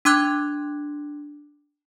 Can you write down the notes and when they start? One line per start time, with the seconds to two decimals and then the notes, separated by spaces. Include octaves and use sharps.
0.05 D4 C6 D6 F#6 G#6